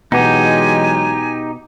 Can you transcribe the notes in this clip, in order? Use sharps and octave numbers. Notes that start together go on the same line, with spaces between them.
B2 E3 F#3 G#3 B3 D#4 G4 G#5